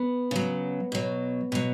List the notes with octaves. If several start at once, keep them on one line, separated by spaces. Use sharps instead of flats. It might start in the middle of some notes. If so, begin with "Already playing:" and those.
Already playing: B3
C#3 F#3
B2 F#3
B2 F#3